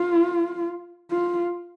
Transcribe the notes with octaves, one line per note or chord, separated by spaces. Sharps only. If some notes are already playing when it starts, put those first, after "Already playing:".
Already playing: F4
F4